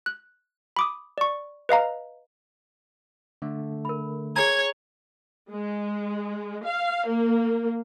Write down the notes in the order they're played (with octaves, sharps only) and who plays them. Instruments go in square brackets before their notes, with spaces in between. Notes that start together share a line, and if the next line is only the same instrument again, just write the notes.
[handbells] F#6
B5 D6 D#6
D5 C#6
B4 D#5 F5 A#5
[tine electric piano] D3 A3
[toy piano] A#4 B5
[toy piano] G#4 G#5 A#5 [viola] C#5 [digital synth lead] G#6
[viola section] G#3
F5
A#3